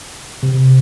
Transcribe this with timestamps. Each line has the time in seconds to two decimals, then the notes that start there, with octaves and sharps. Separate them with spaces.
0.43 C3